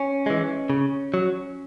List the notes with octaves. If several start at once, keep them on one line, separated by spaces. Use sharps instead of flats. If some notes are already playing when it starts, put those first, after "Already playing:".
Already playing: C#4
E3 G#3
C#3
F#3